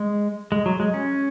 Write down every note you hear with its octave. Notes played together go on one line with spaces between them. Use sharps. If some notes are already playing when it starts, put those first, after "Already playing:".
Already playing: G#3
G#3
F#3
G#3
C#4